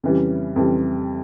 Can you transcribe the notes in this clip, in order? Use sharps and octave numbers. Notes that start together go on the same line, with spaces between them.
F2 C#3 E3 G3
F2 C#3 E3 G3